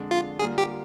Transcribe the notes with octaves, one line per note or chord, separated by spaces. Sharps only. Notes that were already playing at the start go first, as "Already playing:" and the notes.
Already playing: F2 D3 G#3 D4
F4
D3 G3 A#3 F4 G#4
G4